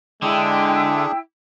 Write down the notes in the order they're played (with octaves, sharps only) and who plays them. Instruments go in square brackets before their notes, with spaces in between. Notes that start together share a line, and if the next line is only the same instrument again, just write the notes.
[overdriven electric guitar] D3 [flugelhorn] G#3 [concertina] D4 G#4 [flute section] E4 G5